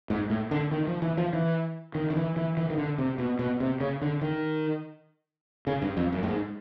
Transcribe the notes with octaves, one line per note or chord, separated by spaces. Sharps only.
G#2
A2
D3
D#3
F3
E3
F3
E3
D#3
D#3
E3
E3
E3
D#3
D3
C3
B2
B2
C3
C#3
D3
D#3
C#3
G2
F2
F#2
A2
G#2